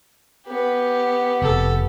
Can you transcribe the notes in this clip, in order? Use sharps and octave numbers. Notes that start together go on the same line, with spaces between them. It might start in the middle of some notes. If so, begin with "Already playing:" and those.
B3 G4
F1 A4